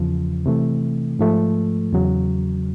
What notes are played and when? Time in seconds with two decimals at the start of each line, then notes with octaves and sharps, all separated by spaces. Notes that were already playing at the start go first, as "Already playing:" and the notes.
Already playing: E2 C#3 F3
0.46 C3 E3 A3
1.19 G#2 F3 A3
1.93 E2 C#3 F#3